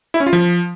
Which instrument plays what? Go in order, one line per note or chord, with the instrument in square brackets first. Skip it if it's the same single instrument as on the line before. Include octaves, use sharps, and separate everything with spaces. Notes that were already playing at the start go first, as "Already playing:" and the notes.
[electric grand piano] E4
C#4
F4
F3